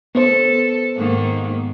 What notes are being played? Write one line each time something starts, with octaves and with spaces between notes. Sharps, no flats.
B3 A4 C5
G#2 D#3 A#3